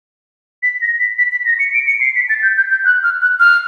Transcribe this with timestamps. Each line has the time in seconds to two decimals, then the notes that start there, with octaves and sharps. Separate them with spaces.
0.63 B6
0.82 A#6
0.99 B6
1.18 B6
1.32 B6
1.45 A#6
1.59 C#7
1.74 D7
1.87 C#7
2.01 C7
2.16 B6
2.29 A6
2.43 G6
2.57 G6
2.71 G6
2.85 F#6
3.03 F6
3.22 F#6
3.40 F6